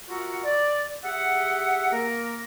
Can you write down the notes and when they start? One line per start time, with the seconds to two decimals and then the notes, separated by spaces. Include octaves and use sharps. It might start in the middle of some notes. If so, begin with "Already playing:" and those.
0.09 F4 F#4 A#4 E5 F#5
0.44 D5
1.03 G4 G#4 E5 F#5
1.92 A#3 A#4